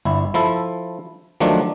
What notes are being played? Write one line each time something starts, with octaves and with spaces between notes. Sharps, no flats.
G1 E4
F3 E4 A4
D#3 F3 F#3 A3 D4